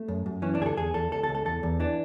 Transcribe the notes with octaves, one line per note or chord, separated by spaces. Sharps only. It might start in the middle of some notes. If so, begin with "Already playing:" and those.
Already playing: A3
F#2
F#2
E3 C#4
D4
D2 G#4
A4
E2 G#4
E2 A4
C#2 A4
A4
C#2
A4
E2 A4
E2
E3 D4